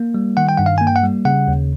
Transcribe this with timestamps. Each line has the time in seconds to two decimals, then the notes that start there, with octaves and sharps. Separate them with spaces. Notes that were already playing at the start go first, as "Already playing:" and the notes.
Already playing: A#3
0.14 G3
0.37 D#3 F#5
0.49 G5
0.57 G2 F#5
0.66 F5
0.78 A#3 G#5
0.87 G5
0.96 F#5
1.03 G3
1.25 C#3 F#5
1.48 D#2